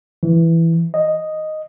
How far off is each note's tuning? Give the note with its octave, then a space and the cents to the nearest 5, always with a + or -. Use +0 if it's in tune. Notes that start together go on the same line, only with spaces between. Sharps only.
E3 +5
D#5 -5